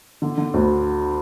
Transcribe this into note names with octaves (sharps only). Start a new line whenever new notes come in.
D3
D3
D2